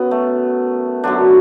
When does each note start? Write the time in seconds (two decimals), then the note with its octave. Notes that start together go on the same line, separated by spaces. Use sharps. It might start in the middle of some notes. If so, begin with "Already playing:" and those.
Already playing: F#2 F#3 B3
0.11 A3
1.04 F#2 D3 F#3 D4